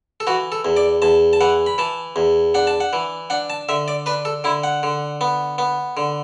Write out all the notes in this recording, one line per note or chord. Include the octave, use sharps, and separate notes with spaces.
A4
E3 F#4
A4
E2
D5
E2 A5
A5
E3 F#5
B5
E3 A5
E2
D4 F#5
A5
F#5
E3
D4 F#5
A5
D3 E5
D5
D4 B4
A4
D3 E4
F#5
D3
B3
B3
D3